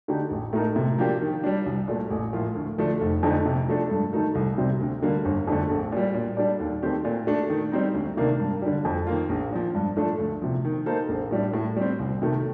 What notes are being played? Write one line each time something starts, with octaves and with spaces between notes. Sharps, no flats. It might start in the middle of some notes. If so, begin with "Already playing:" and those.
D3 A3 D#4 G4
A1
A2 A3 D#4 A#4
C3
F3 A#3 D4 G4
D#3
G3 D4
C2
A#2 A3
A1
A2 F3 A#3 F4
D2
D3 F3 A3 D4
F1
F2 D3 A3 D#4
C3
F3 A3 D4 A4
G2
D#3 A3 D#4 A4
C2
C3 G3 C4
D2
D3 G3 A#3
G1
F2 D3 A3
A#1
A#2 G3
A#2
G3 D4 A4 D5
D#2
D#3 A3 C4 G4
A#2
A3 D4
D#3
G3 C4 D#4
D2
C3 D#3 A#3 D4
G2
D3 G3
F2
D#3 A#3 F4
A#1
A#2 F3
G2
F3 A3 D4 A4
D2
C3 F3
D#3
A#3 D#4 A4 C5
A#1
A2 G3 D4
A2
G3 C4
C2
C3 D#3 A3